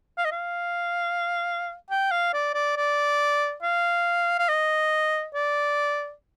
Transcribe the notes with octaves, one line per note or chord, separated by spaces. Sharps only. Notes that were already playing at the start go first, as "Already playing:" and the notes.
F5
D#5
F5
G5
F5
D5
D5
D5
F5
F5
D#5
D5